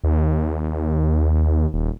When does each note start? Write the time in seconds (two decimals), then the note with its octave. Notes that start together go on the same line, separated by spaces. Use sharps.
0.04 D#2
1.74 D#1